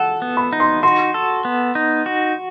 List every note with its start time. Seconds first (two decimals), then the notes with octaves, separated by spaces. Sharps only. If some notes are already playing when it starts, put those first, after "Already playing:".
Already playing: A4 F#5
0.22 B3
0.37 B5
0.53 D#4
0.60 C6
0.83 F#4 C6
1.14 A4
1.45 B3
1.75 D#4
2.06 F#4